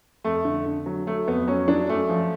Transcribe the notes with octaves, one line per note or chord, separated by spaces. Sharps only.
F2 A3
D3
D3
F#3
F#3 A3
F2 B3
F#3 C#4
F#3 D4
F#2 A3
F3